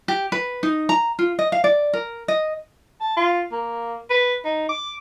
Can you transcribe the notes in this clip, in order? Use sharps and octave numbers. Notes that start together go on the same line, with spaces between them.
G4
B4
D#4
A#5
F4
D#5
F5
D5
A#4
D#5
A5
F4
A#3
B4
D#4
D6